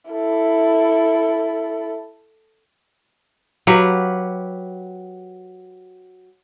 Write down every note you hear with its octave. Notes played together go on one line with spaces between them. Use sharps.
E4 A4
F#3 G4 B4 F5